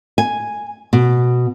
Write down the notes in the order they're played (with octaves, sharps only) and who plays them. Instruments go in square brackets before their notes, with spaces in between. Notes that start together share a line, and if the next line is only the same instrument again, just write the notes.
[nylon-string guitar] G#5
B2